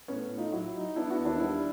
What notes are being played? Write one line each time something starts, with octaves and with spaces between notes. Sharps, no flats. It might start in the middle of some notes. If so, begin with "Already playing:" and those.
A2 B3 C#4
A2
D#4 F4
F#3 E4 F#4
D#4
B3 D4 E4
E4 F#4
D#2
D4 E4
G3 D4 E4